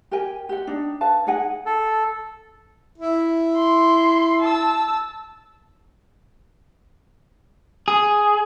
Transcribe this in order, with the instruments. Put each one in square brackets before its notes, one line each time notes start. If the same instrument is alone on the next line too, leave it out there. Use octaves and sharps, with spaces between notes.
[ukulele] G4 A#4 G5 G#5
G4 F#5
D4 D#4
B4 F5 A5
D#4 G#4 F#5 G#5
[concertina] A4
[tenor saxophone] E4
[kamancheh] C6
A5 E6
[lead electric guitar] G#4